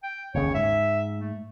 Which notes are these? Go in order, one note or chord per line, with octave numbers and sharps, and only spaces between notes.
G5
G1 D#2 C#3 C#5
G#2 E5
A3